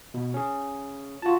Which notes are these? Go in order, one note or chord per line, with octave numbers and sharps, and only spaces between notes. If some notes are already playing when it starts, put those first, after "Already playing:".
B2
C#4 G#4
F4 F#4 A5